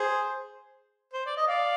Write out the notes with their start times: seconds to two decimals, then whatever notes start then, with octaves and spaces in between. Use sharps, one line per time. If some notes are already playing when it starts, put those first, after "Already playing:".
Already playing: G#4 C5
1.13 C5
1.26 D5
1.37 D#5
1.47 D5 F5